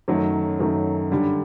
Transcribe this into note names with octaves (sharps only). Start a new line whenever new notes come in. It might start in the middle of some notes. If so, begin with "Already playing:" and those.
F#2 D#3 F#3 A3
F#2 D#3 F#3 A3
G2 D3 G3